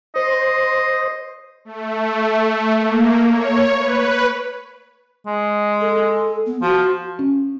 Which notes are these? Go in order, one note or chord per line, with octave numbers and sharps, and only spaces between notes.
C5 D#5
A3
A#3
C#5
B4
G#3
A4
B3
F3 F#4
C#4